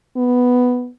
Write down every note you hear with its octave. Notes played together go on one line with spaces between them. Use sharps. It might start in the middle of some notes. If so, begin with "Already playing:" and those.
B3